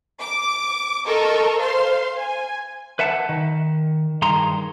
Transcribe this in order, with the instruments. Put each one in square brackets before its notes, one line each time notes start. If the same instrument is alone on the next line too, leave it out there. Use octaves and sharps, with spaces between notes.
[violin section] D6
A4 A#4 D#5 C#6
C5 F5 C6
G#5
[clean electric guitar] B4 E5 F#5 A5
D#3
G2 D#3 G#4 A#5 C6